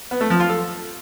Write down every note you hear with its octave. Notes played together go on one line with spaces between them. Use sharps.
B3
A3
F3
F4
A4